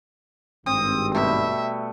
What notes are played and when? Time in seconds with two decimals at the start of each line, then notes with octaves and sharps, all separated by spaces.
0.66 G#1 G2 C4 D#6
1.14 B2 G3 A3 E5